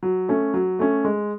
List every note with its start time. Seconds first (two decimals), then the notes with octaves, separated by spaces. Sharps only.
0.03 F#3
0.28 A3 C#4
0.54 F#3
0.79 A3 C#4
1.04 G#3